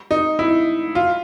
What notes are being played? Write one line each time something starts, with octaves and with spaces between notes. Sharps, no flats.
D#4
E4
F4